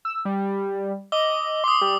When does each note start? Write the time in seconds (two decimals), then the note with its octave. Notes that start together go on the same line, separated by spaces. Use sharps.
0.05 E6
0.25 G3
1.12 D#5 D6 E6 G7
1.64 C6 D6 D#6
1.81 G3